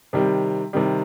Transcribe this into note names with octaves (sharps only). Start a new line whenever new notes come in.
C3 D#3 G3
C3 D#3 G3